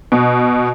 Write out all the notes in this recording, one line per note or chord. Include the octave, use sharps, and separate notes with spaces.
B2